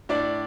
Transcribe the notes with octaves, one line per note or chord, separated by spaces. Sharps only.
A2 D4 D5